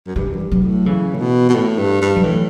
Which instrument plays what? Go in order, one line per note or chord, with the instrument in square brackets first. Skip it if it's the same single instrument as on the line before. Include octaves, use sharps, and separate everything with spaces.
[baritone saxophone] F#2
[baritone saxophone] G2 [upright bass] E3
[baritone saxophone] F#2
G2
[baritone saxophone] G2 [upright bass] F#3
[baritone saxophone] A2
[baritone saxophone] C#3 [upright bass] E3
[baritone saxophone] A2
B2
B2
A2
G2
G2
[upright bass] F#3
[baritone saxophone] A2 [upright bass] E3